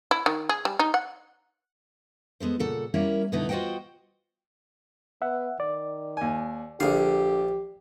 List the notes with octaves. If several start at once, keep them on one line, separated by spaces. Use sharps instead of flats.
E4
D#3
G#4
G3
D#4
F#5
G#3 B3 A4 C5
A#2 C#3 A4 F#5
G3 A#3 C#4 E4 A#4 C#5
B2 D3 B3 D#4 E4
F4 F#4 C5 D#5 F#5 G5
B3 E5 F#5
D#3 D5
D#2 G#5
A#1 D3 G4 F5